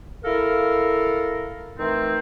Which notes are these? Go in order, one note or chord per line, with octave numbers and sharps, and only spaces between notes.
E4 A4 A#4 F5
D#3 E3 A3 C4